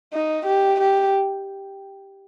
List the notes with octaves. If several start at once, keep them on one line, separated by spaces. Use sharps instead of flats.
D#4
G4
G4